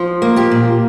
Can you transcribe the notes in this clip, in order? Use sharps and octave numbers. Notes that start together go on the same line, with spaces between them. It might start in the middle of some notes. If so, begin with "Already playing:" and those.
Already playing: F3
A#3
F4 G4
A#2